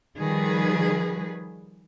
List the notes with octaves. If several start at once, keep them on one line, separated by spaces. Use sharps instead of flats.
D#3 F3 G3 G#4 B4